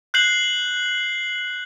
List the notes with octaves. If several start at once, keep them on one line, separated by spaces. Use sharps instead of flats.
F#6 G6 C7 F#7